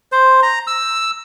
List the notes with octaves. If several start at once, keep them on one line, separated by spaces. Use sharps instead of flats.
C5
A#5
E6